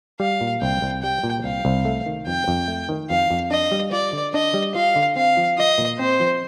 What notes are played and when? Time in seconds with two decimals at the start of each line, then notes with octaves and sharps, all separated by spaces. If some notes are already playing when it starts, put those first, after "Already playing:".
0.20 G3 F5
0.41 A#2
0.62 C2 G5
0.82 C2
1.03 G3 G5
1.24 A#2
1.44 C2 F5
1.65 C2
1.85 A3
2.06 D#3
2.27 F2 G5
2.48 F2
2.68 A3
2.89 D#3
3.10 F2 F5
3.31 F2
3.51 D4 D#5
3.72 G3
3.92 F4 D5
4.13 D3
4.34 D4 D#5
4.54 G3
4.75 F4 F5
4.96 D3
5.16 C4 F5
5.37 F3
5.58 F4 D#5
5.78 A#2
5.99 C4 C5
6.20 F3